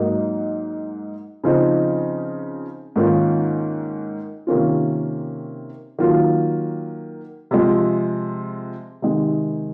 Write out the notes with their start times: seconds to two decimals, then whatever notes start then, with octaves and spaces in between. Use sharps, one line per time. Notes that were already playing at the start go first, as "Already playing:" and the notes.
Already playing: G#2 F#3 A#3 D#4
1.44 C#3 F3 C4 D#4
2.96 G#2 D#3 A#3 C#4 F4
4.47 C3 D#3 A#3 C#4 F4
5.98 D#3 F#3 A#3 F4
7.51 C3 F3 G#3
9.02 C3 D#3 G#3 D#4